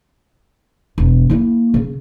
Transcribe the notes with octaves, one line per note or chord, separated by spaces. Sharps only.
E1
A#3 E4
C#3